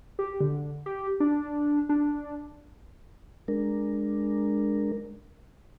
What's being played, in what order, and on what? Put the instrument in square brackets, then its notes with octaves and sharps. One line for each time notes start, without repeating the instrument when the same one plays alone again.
[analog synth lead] G4
D3
G4
D4
D4
[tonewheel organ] G#3 D4 A#4